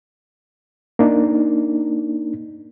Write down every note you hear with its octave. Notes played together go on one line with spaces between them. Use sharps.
A#3 D4 D#4